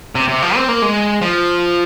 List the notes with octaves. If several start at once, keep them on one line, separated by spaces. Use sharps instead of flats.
C3
C3
F3
C4
A#3
G#3
F3